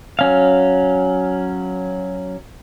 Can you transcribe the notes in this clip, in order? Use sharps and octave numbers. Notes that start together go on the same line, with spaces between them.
F#3 C#4 F5